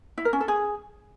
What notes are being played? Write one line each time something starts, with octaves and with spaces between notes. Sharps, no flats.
E4
A#4
C#4
A4
G#4